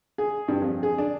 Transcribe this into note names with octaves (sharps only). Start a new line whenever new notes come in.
G#4
G2
F2
G#4
D4